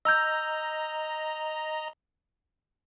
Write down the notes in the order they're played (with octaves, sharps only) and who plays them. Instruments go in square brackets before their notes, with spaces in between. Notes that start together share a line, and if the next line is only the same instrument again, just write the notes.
[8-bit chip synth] D#5 A#5 [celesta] E6 G6